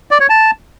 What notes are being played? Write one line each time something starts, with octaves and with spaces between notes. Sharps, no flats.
D5
C#5
A5